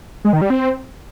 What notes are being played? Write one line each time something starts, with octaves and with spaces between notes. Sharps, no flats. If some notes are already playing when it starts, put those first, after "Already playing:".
G#3
D#3
G3
C4